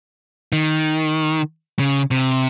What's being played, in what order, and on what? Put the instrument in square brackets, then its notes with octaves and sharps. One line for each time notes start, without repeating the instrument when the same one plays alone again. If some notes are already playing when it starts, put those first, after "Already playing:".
[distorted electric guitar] D#3
C#3
C3